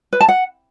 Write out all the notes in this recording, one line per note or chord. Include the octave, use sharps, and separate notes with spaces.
B4
A5
F#5